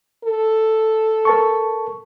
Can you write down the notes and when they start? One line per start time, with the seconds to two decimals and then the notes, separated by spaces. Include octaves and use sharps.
0.24 A4
1.25 A#4 A5 C#6